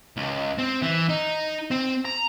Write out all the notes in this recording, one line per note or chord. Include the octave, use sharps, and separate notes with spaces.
C#2
C4
E3
D#4
C4
A#5